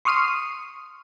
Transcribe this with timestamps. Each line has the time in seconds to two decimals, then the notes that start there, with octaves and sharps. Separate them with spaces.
0.05 C6 C#6 D#6 F6 C7 D#7